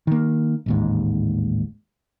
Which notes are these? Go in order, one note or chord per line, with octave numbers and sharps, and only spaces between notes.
D#3 A#3
A1 D#2 G#2